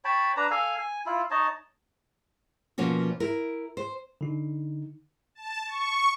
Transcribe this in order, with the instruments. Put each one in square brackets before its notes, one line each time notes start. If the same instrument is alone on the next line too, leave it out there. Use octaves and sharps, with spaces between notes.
[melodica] C#5 G5 A5 B5
D4 B4 A#5
A4 F5 G#5
G#5
E4 F4
D#4 C#5 D#5 A5
[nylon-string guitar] B2 F3 A#3 C#4 F#4
E4 A#4
C5
[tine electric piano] D3 D#4
[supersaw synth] A5
C#6